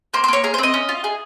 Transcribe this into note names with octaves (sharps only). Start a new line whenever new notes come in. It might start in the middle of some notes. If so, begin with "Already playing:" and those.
A#3 C5
C5
A#3 C#5
G#4 A#4
C5
C4 D#5
C#4
F4
G#4